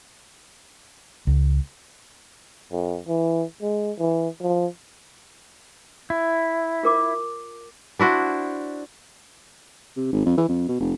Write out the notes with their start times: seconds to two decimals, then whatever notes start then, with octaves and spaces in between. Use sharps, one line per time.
1.27 C#2
2.72 F2
3.08 E3
3.62 G#3
3.99 E3
4.42 F3
6.10 E4
6.83 F4 A#4 D6
7.99 D4 E4 F#4 C5
9.97 C3
10.12 G#1
10.26 F2
10.37 E3
10.49 F2
10.68 B2
10.80 F1